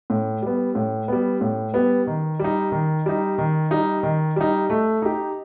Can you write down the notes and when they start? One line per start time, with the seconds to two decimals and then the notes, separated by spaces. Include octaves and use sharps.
0.10 A2
0.42 G3 B3
0.75 A2
1.08 G3 B3
1.41 A2
1.74 G3 B3
2.07 D#3
2.39 G3 D#4
2.72 D#3
3.06 G3 D#4
3.38 D#3
3.71 G3 D#4
4.03 D#3
4.36 G3 D#4
4.70 A3
5.02 D#4 G4